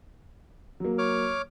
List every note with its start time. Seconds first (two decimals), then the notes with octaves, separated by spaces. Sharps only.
0.80 F#3 A#3
0.98 C#5 D6 F6